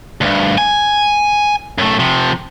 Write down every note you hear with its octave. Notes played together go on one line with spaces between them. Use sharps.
D2 G2
G#5
F#2 A3
C3 F3